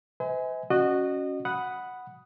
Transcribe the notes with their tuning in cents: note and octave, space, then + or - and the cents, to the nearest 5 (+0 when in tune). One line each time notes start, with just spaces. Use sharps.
C5 -45 E5 -45 G#5 +0
C#4 +0 F#4 +0 D#5 -30
F#5 +0 B5 +0 D#6 +0